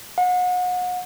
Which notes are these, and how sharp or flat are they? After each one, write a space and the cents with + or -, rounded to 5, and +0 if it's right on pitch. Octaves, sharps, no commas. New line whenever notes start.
F#5 -35